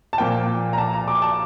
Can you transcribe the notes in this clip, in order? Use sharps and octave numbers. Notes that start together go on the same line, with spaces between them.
A5
A#2 F3 A#3 G5
A#5
A5
A#5
D6
A5